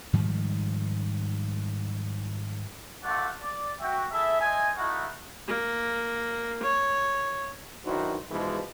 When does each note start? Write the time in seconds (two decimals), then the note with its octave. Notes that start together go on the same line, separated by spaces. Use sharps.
0.13 G#2 D#3 F3 G3
3.04 A3 C4 F4 D5 F#5
3.40 D5
3.81 F#4 E5 G5
4.11 E4 G#4 A4 E5
4.41 C5 D#5 E5 G#5
4.77 A3 D#4 E4 F#4 F5 F#5
5.48 A#3
6.63 C#5
7.85 B1 D#3 D4 E4 F#4 C5
8.31 G#2 B2 E3 F3 G#3